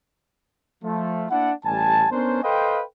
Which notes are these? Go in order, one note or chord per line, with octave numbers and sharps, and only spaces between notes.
F3 A3
A#3 D4 E4 F#5
A1 G3 G#5 A5
B3 C#4 D4 A#4 C5
A4 B4 C5 D#5 F5 G5